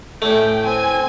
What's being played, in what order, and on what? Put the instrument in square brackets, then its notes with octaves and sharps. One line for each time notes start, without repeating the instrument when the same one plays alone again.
[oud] A2 E3 C#4 [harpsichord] A3 [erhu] G5
[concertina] C4 [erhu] G#5